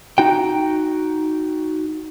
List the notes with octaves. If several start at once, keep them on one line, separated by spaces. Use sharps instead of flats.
D#4 F#4 G5